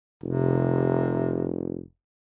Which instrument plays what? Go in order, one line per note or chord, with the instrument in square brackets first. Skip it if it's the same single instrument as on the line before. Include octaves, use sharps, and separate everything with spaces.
[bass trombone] F1 [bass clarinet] C3